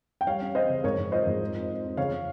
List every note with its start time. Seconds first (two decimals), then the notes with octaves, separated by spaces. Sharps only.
0.21 G5
0.26 G3 C#5 F5
0.41 C#4
0.55 C#4 C5 D#5
0.69 C#3
0.84 G#2 A#4 C#5
0.98 G#2
1.12 F3 C5 D#5
1.27 G#2
1.41 F2
1.55 F2
1.70 F2
1.83 F2
1.97 C#3 C#5 F5
2.12 C#3